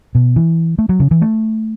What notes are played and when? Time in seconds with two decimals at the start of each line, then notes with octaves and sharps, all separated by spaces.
0.15 B2
0.36 E3
0.79 A3
0.89 F#3
1.00 C#3
1.11 E3
1.21 A3